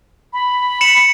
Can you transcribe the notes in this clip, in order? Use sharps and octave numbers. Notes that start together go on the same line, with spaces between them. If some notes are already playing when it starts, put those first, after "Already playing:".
B5
C#7 E7 F#7